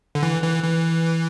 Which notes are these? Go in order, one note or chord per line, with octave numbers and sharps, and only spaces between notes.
D3
E3
E3
E3